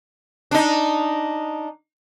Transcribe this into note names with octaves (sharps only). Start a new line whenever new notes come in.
D4 D#4